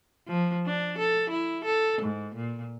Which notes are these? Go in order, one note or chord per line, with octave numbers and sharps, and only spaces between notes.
F3
D4
A4
E4
A4
G#2
A#2